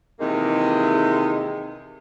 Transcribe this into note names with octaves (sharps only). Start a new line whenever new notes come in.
C3 D#3 E3 G#3 A#3 D#4